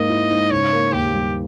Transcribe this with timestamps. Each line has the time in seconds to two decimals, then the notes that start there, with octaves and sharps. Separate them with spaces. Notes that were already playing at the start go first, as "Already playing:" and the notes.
Already playing: G#2 A#3 D#5
0.09 E4
0.31 G#2
0.51 C#3 C#5
0.73 A#3
0.93 D#2 G4
1.14 G3